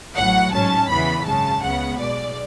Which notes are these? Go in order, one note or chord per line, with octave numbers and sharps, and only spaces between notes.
A1 A2 F#3 F#5
A1 G#2 F#3 C#4 A5
E2 C#3 E3 B3 B5
G#1 F#2 C#3 G#3 A5
C#2 C#3 G#3 B3 F#5
B1 B2 G#3 D5